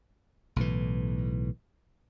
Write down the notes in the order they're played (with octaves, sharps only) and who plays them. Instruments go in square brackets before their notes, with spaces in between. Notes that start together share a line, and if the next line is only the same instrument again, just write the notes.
[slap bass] B1 A2 E3